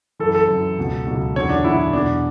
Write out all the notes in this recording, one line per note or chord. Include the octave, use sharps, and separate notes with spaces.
F#2 E3 A4
A4
F#2 E3
C#2 B2 F#3
C#2 B2 F#3
E2 D3 F#3 C#5
D4
E2 D3 F#3 E4
E2 B2 F#3 D4